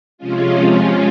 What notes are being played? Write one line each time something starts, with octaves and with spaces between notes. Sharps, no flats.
C3 F3 G#3 C#4 F4